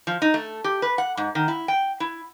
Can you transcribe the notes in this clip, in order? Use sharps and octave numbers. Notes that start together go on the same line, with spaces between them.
F3
D#4
A3
G4
B4
F#5
G#2
D#3
E4
G5
E4